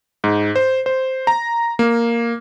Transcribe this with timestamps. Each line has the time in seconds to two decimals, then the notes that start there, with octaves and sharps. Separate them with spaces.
0.24 G#2
0.56 C5
0.86 C5
1.27 A#5
1.79 A#3